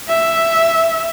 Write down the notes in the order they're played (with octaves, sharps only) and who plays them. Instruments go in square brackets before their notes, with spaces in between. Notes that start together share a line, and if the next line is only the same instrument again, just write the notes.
[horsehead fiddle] E5